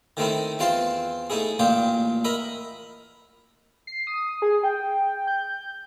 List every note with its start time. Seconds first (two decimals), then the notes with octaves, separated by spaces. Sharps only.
0.17 D#3 A3 C4 D#4 E4
0.59 E2 C4 F4 A5 C6
1.30 A3 D#4 E4 G#4
1.59 A1 A#2 D4 F4 G5
2.25 A#4 D#5 E5 B5
3.87 C7
4.07 D#6
4.42 G#4
4.63 G5
5.27 G6